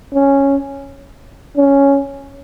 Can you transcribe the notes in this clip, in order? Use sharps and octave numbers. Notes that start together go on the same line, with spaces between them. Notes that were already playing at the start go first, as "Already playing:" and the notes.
C#4
C#4